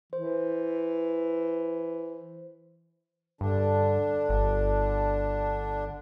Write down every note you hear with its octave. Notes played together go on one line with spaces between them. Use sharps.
E3 C5
G2 D3 D4
G1